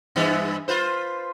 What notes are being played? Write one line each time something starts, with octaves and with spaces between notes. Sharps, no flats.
G2 E3 B3
F4 B4 C5